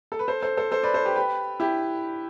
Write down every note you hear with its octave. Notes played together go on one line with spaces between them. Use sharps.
A4
B4
A4 C5
A4 C5
A4 C5
A4 C5
B4 D5
A4 C5
G4 B4
G4 B4
E4 G4